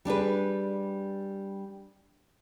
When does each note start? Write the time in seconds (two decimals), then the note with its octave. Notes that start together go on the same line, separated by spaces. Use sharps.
0.05 G3 D4 G#4 B4